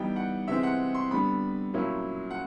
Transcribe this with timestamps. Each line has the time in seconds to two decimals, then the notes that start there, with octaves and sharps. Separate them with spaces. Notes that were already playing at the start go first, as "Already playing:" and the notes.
Already playing: E3 G3 B3 D#4 G5
0.16 F#5
0.48 C3 E3 G#3 C4 E5
0.63 F#5
0.95 C6
1.11 D3 G3 B3 B5
1.74 A#2 F#3 A#3 C#4 E4
2.30 F#5